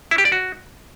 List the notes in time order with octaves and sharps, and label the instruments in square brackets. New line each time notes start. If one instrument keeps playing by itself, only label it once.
[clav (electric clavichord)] E4
G4
D5
F#4